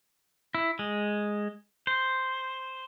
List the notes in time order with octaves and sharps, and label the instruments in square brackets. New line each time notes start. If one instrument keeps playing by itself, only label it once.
[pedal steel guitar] E4
G#3
C5